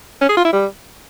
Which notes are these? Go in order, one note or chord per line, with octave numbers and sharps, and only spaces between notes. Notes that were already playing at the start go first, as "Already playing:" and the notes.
C#4
G#4
F4
E4
G3